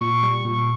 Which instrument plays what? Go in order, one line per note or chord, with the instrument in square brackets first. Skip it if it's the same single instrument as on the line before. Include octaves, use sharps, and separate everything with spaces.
[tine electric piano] A#2 [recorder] C#6
[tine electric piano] G3
A#2